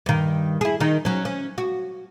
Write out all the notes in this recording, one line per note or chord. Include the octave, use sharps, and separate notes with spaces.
G2 D#3
E4 G#4
D#3 D#4
F#3 C#4
C#4
F#4